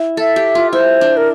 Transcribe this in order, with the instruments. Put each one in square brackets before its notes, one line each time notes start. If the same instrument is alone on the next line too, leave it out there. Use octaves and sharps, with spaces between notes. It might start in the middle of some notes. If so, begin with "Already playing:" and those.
Already playing: [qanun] E4
[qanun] A4 [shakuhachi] E5
[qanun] G4
F4
[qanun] E4 [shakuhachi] C5
[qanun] D4
[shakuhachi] A#4